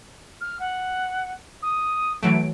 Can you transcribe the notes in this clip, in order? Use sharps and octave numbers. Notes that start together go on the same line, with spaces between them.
F6
F#5
D#6
E3 F#3 A3 D7